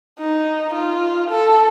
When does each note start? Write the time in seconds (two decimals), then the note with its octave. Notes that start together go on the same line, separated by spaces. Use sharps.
0.19 D#4
0.74 F4
1.30 A4